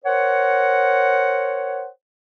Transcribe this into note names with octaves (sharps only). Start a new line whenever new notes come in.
A#4 C5 C#5 F#5